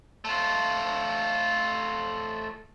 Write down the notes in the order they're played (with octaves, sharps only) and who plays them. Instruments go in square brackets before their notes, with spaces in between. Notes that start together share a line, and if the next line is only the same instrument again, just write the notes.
[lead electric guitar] A3 F4